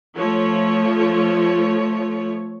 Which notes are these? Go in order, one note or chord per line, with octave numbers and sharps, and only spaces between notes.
F3 A3 C#5